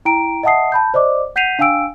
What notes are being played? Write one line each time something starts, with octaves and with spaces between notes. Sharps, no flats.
E4 G5 A#5 D7
D#5 E5 F#5 A5 D#6 C7
A5 B5 G6
C5 D5 D#5 D6
F#5 G6 B6 C7 D#7 F7
D4 F5 G5 G#5 E6 D7